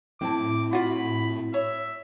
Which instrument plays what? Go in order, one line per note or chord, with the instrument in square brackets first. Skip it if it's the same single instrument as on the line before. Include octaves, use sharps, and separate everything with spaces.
[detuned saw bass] A2 [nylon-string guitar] C4 E4 A5 [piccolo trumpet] D6
[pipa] F4 F#4 [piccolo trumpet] B5
[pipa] C#5 [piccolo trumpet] E5